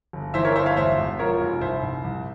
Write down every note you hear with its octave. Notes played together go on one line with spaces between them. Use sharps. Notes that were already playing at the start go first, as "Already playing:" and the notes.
G1
E3 C5 E5
A#4 C#5
G1 C5 E5
C#5 F5
E1 C5 E5
E1
F3 A#4 C#5
F1
C2 C5 E5
C2
C2